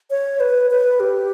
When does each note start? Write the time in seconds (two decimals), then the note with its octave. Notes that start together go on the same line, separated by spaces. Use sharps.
0.10 C#5
0.40 B4
0.71 B4
1.00 G4